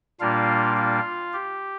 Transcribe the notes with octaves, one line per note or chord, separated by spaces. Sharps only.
A#2 G3 A#3 D4 F4 F5
F4 F5
G4